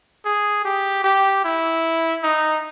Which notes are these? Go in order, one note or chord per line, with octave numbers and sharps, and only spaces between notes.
G#4
G4
G4
E4
D#4